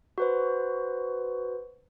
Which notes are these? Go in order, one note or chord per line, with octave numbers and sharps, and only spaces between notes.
F#4 B4 C5